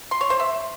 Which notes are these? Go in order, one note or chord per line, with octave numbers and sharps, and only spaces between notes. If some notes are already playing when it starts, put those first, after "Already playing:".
C6
C#5
C5
E5